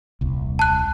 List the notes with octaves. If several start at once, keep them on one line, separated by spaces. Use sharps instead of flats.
D#1 C2
A5 F#6